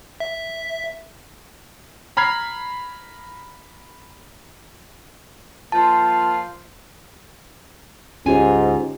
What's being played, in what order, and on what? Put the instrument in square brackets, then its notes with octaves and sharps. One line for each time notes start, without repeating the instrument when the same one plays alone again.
[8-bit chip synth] E5
[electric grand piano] A#5 B5 F6 G#6 C7
[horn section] F3 A#3 F4 [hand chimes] A5
[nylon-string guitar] D2 F4 G#5 [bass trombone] G#2 [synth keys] C#4 G4